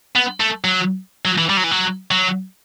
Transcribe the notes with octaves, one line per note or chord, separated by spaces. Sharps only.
B3
A3
F#3
F#3
E3
G3
F#3
E3
F#3
F#3